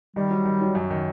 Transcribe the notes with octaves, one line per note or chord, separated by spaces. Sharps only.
D#3 G3
F#3
D#3
F#3
F#2
D#3